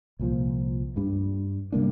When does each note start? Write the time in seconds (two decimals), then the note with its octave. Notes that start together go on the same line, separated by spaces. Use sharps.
0.19 C2 A#2 F3
0.96 G2 G3 D4
1.72 C3 G3 A#3 D4